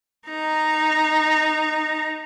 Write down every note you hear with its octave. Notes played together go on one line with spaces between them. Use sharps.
D#4 A#5